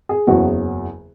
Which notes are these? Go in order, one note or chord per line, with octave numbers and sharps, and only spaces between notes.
G#4
F#1 E2 C#3 F#3 F#4